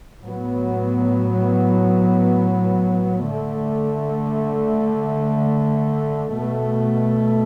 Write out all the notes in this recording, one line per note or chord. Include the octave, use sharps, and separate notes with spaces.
A2 F#3 B3
D3 A3
B2 A3